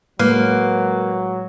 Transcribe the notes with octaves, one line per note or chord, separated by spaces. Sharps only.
A2 F#3 G#3 A#3 B4